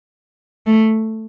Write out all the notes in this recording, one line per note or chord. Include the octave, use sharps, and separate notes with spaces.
A3